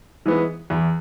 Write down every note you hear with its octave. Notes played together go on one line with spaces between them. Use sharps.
E3 G#3 B3
E2